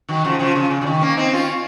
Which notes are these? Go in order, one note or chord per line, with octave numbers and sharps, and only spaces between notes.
D#3 F#3
C#3 F3
C#3 F3
C#3
C#3
C#3
D#3
A#3 C#4
C4 D#4
C#4 F4